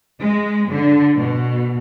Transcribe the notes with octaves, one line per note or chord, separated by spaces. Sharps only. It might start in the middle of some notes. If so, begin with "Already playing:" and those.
G#3
D3
B2